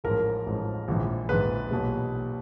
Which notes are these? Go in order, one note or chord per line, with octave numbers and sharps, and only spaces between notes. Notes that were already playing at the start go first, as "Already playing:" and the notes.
A1 G#2 F3 A#4
A1 G#2 F3
A#1 G#2 E3
A#1 G#2 E3 B4
B1 A#2 G3